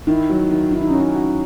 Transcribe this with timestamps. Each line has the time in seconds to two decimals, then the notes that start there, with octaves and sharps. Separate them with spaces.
0.07 D#3 E4
0.30 F#3
0.51 D#3
0.72 D#3 E4
0.82 D#4
0.90 C#4 F#4
1.00 D#4
1.15 F#4